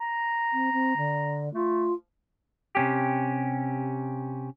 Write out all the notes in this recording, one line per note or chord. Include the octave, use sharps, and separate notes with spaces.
A#5
C4
C4
D3
A3 F4
C3 C#4 G4